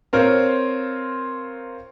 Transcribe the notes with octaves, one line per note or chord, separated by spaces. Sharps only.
C4 F4 A#4 C5 C#5